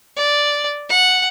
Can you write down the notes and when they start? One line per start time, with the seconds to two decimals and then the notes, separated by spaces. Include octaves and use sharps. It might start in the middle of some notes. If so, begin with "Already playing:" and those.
0.17 D5
0.89 F#5